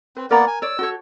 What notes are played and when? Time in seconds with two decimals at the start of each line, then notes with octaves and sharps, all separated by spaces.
0.17 C4 B4
0.31 A#3 B3 A#4 D5 A#5
0.47 G#5
0.62 C#5 D5 E6
0.79 F#4 A4 C#5